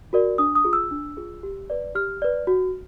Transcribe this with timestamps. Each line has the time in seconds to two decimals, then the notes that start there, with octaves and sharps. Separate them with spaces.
0.13 F#4 A#4 D5
0.38 D4 D#6
0.55 D#6
0.65 F4 G#4
0.73 E6
0.91 D4
1.17 F4 G#4
1.43 G4
1.70 B4 D5
1.95 G4 F6
2.22 B4 D5
2.47 F#4